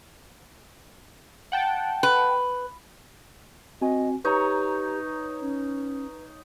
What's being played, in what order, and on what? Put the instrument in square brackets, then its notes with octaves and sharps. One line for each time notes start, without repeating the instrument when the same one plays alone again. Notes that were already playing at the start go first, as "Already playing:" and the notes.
[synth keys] F#5 G5 A5
[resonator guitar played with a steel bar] B4
[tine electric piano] C4 F#4 G#5 [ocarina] D#5
[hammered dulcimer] D#4 C#5 [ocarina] G4 [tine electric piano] B4 A#5
[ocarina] C#4